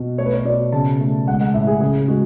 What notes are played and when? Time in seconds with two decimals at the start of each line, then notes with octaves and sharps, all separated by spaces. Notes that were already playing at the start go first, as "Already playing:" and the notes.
Already playing: B2
0.18 A3 C#5
0.25 B4
0.33 C#5
0.45 B2 D5
0.72 C#3 A5
0.99 A3
1.28 G#3 F#5
1.41 F#5
1.54 A2 E5
1.67 G#4
1.81 C#3 G#4
2.08 G#3 F#4